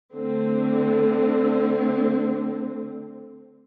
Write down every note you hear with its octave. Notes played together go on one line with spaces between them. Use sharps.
D3 A3 C4